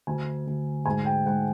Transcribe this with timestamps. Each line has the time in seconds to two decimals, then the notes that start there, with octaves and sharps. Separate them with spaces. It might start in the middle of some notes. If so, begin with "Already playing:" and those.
0.07 D2 G#5
0.47 D2
0.86 G#2 G#5
1.05 G5
1.26 G#2 F#5